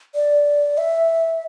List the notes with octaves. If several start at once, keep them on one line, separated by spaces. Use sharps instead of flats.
D5
E5